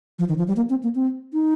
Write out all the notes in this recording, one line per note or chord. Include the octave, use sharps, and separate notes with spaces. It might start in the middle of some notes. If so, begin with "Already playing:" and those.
F3
D#3
F3
G3
A#3
C4
A#3
C4
D#4